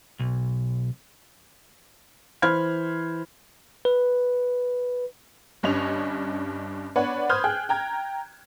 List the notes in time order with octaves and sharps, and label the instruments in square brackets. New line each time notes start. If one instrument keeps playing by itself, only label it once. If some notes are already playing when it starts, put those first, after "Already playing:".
[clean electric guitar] B1
[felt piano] E3 C5 B5 F6 G#6
[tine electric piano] B4
[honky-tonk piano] G1 G2 C#4 D#5 F7
B3 D4 B4 C#5 F#5
B4 C5 D#6 F6 G6 G#6
G#4 G5 F#6
G5 A#5 G#6